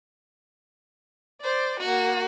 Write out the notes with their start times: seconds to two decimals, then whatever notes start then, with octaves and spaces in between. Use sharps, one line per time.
1.42 C5 D5
1.80 A#3 F#4